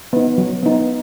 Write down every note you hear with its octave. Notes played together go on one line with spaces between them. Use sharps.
B3 D#4
F#3
B3 D#4